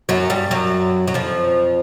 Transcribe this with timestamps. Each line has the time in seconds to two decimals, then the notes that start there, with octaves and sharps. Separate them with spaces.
0.09 F#2 F#3
0.30 G2 G3
0.51 F#2 F#3
1.08 F#3
1.14 F2 F3